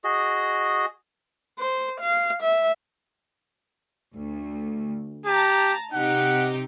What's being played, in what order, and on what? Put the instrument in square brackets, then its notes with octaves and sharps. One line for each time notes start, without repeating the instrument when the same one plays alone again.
[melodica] F#4 G#4 D#5
[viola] C5
F5
E5
[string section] D2
[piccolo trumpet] G4 [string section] A5 A#5
[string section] C3 D#4 G4 [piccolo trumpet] F#5